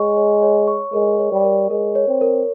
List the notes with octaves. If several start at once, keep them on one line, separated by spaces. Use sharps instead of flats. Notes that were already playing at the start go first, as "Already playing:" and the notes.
Already playing: G#3 C#5 C#6
C#5
C#5
C#6
G#3 A#4
C#5
G3
A#4
G#3 A#4
C#5
C4
A#4